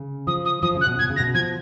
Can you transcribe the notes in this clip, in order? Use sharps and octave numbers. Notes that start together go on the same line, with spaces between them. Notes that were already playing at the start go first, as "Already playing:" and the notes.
Already playing: C#3
F3 D#6
D#6
F3 D#6
C#3
F#6
B2
B2 G#6
C#3
A#6
B2
F3 G#6